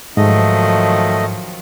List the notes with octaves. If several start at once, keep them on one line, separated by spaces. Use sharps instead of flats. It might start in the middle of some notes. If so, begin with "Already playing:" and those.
G#2 D#3 F3 F#3 A3 D#5